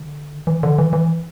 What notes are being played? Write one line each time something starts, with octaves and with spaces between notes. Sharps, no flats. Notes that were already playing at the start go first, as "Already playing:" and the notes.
Already playing: D3
E3
D3
E3
E3